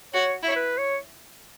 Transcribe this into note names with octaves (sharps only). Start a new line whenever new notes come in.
F#4 C#5
E4
C#5
B4
C#5